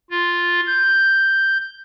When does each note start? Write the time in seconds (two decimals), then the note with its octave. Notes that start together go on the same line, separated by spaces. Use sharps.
0.11 F4
0.67 G6